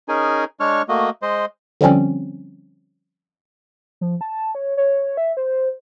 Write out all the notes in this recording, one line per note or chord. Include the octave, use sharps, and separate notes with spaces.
C#4 D#4 G#4 A#4 G#5
G#3 D4 C#5 C#6 F6
A3 A#3 F#4 D#5
G#3 C5 D#5
D3 F3 G3 C4 C#4
F3
A5
C#5
C#5
E5
C5